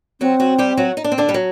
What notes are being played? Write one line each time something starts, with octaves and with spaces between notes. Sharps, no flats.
F#3 C4 F#4
F#3 F#4
G3 G4
F#3 F#4
D#4
D4
C4
D3 D4
G3
F#3